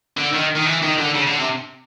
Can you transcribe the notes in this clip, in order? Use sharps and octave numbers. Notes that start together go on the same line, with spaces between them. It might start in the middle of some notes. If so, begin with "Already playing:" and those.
D3
D#3
D#3
E3
D#3
D3
C#3
D3
C3